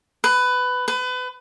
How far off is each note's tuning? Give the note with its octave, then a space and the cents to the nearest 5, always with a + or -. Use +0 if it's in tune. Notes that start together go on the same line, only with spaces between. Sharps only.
B4 +15
B4 +30